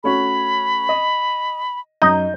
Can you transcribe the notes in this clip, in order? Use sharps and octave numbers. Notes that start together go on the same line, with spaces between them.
A3 C#4 F#4 B5
D#5
F#2 D#4 D#5 G6